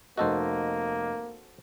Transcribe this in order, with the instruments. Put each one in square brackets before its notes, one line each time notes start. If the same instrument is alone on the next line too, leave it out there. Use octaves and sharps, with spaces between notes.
[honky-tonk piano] F1 D#5 [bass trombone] A#3 [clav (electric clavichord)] F#4 A4 C5